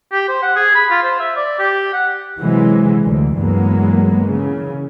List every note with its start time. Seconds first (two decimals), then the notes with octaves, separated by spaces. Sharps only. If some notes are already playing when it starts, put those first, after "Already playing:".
0.12 G4
0.28 C5
0.42 F#5
0.56 G#4
0.75 B5
0.90 F4
1.02 C5
1.19 E5
1.36 D5
1.59 G4
1.93 F#5
2.40 C3 E3 F#3 G#3
3.04 D2 D3
3.38 G2 E3 F#3 G#3 A#3 B3
4.22 C#3 E3